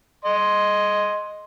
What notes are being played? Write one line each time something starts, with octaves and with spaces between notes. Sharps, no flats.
D#5 C6